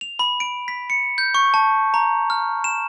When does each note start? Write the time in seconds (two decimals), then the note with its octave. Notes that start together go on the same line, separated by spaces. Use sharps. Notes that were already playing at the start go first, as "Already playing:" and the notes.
0.01 F7
0.19 B5
0.40 D7
0.68 B6
0.90 C#7
1.18 G6
1.34 C#6
1.54 A5
1.94 A#5
2.30 F6
2.64 E7